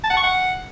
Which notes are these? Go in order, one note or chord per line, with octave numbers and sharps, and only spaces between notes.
A5
F#5
C#6
F#5